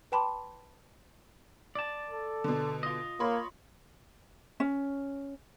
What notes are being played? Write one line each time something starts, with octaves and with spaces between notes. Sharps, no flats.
B4 G5 A5 B5 C6 D6
D5 A5
A4
B2 D3
F4 D#5
A#3 C#5 B5 C6
C#4